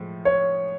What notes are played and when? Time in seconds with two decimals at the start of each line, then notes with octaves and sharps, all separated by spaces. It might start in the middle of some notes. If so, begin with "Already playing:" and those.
Already playing: A2 F3 G#3
0.25 C#5